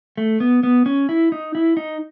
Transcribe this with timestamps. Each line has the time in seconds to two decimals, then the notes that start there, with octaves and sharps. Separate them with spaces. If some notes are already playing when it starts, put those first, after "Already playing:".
0.17 A3
0.40 B3
0.63 B3
0.86 C#4
1.09 E4
1.32 D#4
1.55 E4
1.77 D#4